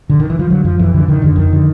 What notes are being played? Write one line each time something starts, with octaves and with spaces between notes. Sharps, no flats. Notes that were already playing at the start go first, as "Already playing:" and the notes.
D3
D#3
E3
F3
D3 F#3
F2 F3
F2 E3
D3 E3
D3 D#3
F2 D3
F2 D#3
D3